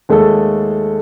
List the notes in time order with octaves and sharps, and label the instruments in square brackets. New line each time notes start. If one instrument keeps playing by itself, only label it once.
[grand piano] D#2 G#3 A3 A4